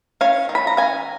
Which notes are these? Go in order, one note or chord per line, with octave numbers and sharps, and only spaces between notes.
C#4 C#5 F5
D#3
B5
A#5
C#4 F5 G#5